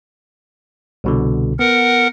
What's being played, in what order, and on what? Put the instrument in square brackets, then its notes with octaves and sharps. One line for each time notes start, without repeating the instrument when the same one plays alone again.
[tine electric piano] C2 B2 D3
[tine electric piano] B3 [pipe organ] A#4 F#5